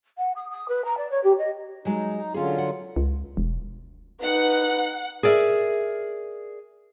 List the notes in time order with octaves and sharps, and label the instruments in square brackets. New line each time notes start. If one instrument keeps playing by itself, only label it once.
[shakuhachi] F#5
D#6
D#6
B4
A#5
D5
C#5
G4
D#5
[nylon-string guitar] F#3 G#3 F#4 [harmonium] D#4
[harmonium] D3 F#3 F4 [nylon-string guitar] C#4 G#4
[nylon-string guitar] F#5
[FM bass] C#2
E1
[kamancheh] D#4 B4 [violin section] F#5
[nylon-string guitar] G#4 A#4 D5 E5